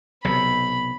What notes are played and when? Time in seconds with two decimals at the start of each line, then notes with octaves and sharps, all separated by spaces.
0.24 B1 C3 B5